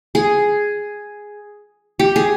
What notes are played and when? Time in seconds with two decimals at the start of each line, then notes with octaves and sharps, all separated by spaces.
0.15 G#4
1.99 G4
2.16 G#4